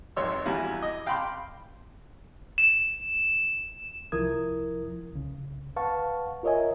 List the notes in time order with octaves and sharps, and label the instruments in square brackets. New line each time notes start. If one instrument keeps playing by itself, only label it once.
[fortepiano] G#1 F2 C#5 C6 E6
E2 G3 E4 F#4 F5
D#5
F5 G5 A5 B5 C6 D6
[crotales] E7
[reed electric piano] C2 F3 E4 A#4 D#6 G#6
C2 C#3
B4 F5 F#5 A5 C#6
F4 A#4 C#5 D#5 E5 G#5